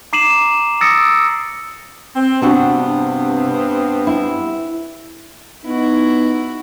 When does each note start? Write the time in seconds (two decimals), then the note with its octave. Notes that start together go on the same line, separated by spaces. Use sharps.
0.13 A#5 D6 C7 D#7 E7 F#7
0.81 D#6 E6 A6 A#6 C#7 D7
2.15 C4
2.41 G2 C3 B3 C4 D4 F#4
4.07 E4
5.64 B3 D#4 E4 F#4